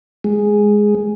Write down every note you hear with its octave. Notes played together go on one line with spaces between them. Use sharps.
G#3